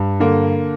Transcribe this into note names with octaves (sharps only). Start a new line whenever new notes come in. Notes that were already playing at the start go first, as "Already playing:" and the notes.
Already playing: G2
D3 A#3